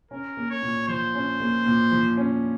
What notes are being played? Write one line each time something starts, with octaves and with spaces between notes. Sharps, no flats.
C#4 A#4
A#3
C#5
A#2
F3 C5
C#4
A#3
A#2
F3
C#4